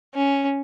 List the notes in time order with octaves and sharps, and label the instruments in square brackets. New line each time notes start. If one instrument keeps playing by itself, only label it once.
[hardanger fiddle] C#4